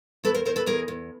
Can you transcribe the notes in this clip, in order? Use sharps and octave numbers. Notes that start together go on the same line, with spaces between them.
E2 A4 B4
A#4 C5
E2 A#4 C5
A4 B4
E2 G#4 A#4
E2